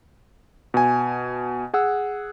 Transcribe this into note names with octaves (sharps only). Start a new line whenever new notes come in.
B2 G#5
G#4 F#5 E6